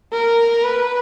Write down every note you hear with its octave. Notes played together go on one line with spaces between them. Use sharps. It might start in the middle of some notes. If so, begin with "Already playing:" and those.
A#4
B4